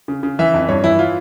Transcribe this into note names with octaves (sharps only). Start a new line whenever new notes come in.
C#3
C#3
E3 E5
F2
G2 C#5
E3 E4
F4